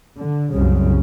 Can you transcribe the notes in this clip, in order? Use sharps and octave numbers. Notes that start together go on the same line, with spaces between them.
D3
C2 F#2 C#3